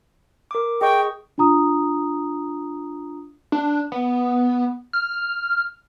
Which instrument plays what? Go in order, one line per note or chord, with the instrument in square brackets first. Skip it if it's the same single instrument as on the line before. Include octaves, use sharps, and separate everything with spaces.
[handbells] A#4 D6
[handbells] G#4 D#5 C#6 [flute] G5
[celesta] D4 F4 A#5 D#6
[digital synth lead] D4
B3
F6